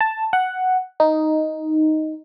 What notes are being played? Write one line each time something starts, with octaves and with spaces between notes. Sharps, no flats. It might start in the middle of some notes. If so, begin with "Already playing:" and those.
A5
F#5
D#4